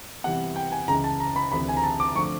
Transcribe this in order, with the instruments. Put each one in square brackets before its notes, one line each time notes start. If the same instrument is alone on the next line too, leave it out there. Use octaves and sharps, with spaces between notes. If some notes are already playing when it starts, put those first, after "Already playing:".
[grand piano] C3 E3 G3 B3 F#5
G5
G#5
C#2 C#3 E3 A#5
A5
A#5
B5
D2 C3 E3 B5
G#5
A#5
A5
D6
D3 F3 A3 C4 C#6